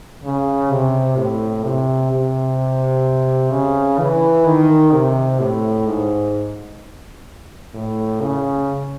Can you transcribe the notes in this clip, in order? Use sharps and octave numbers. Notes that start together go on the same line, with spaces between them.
C#3
C3
A2
C3
C3
C#3
E3
D#3
C3
A2
G#2
A2
C#3